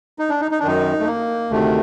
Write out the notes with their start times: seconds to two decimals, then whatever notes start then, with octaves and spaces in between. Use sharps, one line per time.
0.19 D#4
0.30 D4
0.41 D#4
0.51 D#4
0.60 D4
0.62 F#2 D#3 D#4
1.00 A3
1.06 A#3
1.50 D2 C3 D#3 A3